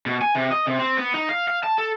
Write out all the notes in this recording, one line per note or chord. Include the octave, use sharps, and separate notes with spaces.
B2
G#5
C3
D#5
C3
C4
B3
D#4
F5
F5
A5
A4